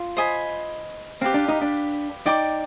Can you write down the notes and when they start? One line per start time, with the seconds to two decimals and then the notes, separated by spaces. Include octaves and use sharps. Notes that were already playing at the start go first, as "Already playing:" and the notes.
Already playing: F4
0.17 C5 D#5 G#5 B5
1.21 C4 G4 B4 F5
1.34 D4
1.48 D#4
1.61 D4
2.26 D#4 D5 G5 D6